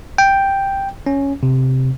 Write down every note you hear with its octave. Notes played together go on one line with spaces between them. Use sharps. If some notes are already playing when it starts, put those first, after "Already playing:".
G5
C#4
C3